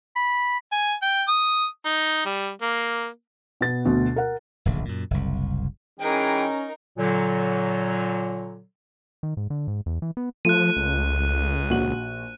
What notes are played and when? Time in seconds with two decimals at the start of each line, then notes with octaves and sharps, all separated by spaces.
0.16 B5
0.72 G#5
1.02 G5
1.28 D#6
1.86 D#4
2.26 G3
2.62 A#3
3.61 B2 B3 A6
3.85 D2 B2
4.16 A#4 F#5
4.65 D1 A#1 C#3
4.85 F#2 A#2
5.11 F#1 C2
6.00 E3 G#3 C#4 D#4 A#4 G5
6.98 A#2 D3 F#3
9.23 D#3
9.37 G#2
9.50 D3
9.68 G#2
9.86 E2
10.02 E3
10.17 B3
10.45 F3 A3 F4 F#6 D#7
10.76 C#2
11.70 A#1 F#4 F#7